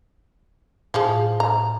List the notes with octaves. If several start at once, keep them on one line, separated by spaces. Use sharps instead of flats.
A2 F3 G#4
A#5